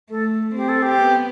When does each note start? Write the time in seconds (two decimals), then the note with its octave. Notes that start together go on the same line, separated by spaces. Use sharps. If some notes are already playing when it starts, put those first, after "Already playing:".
0.10 A3 A4
0.55 C4 G4
0.68 A4
0.82 G4
1.01 B3